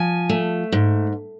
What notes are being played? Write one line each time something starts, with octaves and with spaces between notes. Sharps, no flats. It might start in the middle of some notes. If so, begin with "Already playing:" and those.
Already playing: F3 G#5
A3
G#2